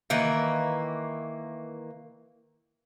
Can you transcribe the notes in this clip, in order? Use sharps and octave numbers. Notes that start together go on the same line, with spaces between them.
D#3 E3 A#3 B4